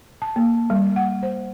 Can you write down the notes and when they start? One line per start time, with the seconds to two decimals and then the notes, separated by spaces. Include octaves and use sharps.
0.22 A5
0.36 A#3
0.70 G3
0.96 F#5
1.23 C5